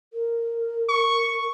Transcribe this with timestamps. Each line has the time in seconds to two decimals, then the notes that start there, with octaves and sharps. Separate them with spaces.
0.13 A#4
0.89 C#6